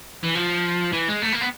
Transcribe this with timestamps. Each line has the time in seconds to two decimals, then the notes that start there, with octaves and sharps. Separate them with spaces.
0.24 E3
0.35 F3
0.92 E3
1.08 G#3
1.22 A3
1.32 A#3
1.41 B3